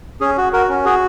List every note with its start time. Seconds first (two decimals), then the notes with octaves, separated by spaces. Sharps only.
0.21 C#4 G#4
0.38 F#4
0.53 F#4 A#4
0.69 C#4
0.85 F#4 G#4